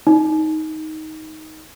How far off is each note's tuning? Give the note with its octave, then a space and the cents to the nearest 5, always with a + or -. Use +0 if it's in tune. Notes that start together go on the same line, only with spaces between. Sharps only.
D#4 +15